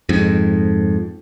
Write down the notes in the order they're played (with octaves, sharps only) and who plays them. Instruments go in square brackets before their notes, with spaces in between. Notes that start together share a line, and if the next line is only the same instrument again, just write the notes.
[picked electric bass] F2 G#2